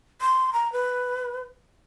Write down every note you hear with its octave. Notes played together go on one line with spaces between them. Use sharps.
C6
A#5
B4